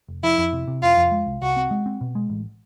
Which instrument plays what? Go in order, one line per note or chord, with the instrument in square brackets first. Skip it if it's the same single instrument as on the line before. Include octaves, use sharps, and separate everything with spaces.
[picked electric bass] F1
[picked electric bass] F3 [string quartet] E4
[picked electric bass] F2
C3
C3
[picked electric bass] F1 [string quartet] F4
[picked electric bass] F2
G#3
C2
[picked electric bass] C2 [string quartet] F#4
[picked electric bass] C4
G#3
C4
B2
G#3
A1